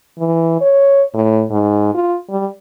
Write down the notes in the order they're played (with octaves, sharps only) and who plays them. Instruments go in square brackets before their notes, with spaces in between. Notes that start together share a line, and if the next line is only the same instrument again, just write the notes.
[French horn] E3
C#5
A2
G#2
F4
G3